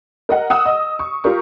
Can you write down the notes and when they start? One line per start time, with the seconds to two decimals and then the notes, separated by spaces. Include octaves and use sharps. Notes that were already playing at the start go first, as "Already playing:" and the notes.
0.29 A#4 D#5 F#5
0.50 F#5 D#6 E6
0.65 D#5
0.99 C#6
1.24 F4 G4 A#4 C#6